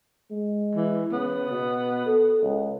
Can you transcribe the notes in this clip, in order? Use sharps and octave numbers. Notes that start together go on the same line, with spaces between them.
G#3
E3
C#3 B3
B2
A4
C#2